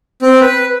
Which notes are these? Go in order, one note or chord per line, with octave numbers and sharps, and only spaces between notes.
C4
B4